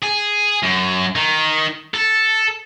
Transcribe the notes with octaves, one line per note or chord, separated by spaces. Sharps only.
G#4
F#2
D#3
A4